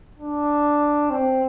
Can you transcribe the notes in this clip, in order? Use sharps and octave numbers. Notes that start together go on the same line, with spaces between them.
D4
C4